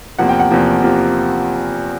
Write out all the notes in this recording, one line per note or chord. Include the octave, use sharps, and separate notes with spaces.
E2 C3 F3 A#3 F#5
G5
F#5
E2 C3 F3 A#3
C3 F3 A#3